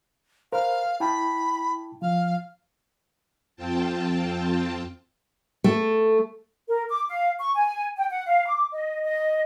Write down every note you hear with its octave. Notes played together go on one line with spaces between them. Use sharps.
A#4 C5 F5
E4 G5 A5 B5
F3 F5
F2 C4 F4 G5 A5
A3
A#4
D6
F5
C#6
G#5
G5
F#5
F5
D6
D#5
D#5